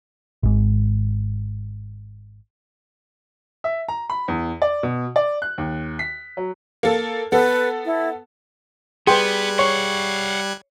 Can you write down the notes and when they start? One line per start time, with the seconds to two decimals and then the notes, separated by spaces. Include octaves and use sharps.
0.43 G#1 G#2
3.64 E5
3.88 A#5
4.10 B5
4.28 E2
4.62 D5
4.83 B2
5.16 D5
5.42 F#6
5.58 D#2
5.99 B6
6.37 F#3
6.83 A#3 A4
7.32 B3 A4 B4
7.85 E4
9.07 G3 B3 G#4 B4 G5 C6 F#6 G#6
9.59 C#5 F5 F#5